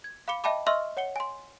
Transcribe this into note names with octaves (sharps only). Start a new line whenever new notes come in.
G#6
F5 B5 D6 C#7 G7
D#5 E5 G5 A5 B5 D6
D#5 E5 C6 C#6 E6 F6
C#5 F#5 C#7 G7
G#5 C6